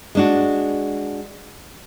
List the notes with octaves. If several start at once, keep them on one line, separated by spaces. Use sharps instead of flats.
G#3 D4 F#4